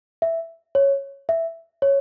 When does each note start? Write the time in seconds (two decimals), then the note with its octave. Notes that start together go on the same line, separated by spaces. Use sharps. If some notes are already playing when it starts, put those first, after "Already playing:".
0.22 E5
0.75 C#5
1.29 E5
1.82 C#5